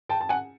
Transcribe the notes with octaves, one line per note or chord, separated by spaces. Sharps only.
G5 A5
A5
F#5 G#5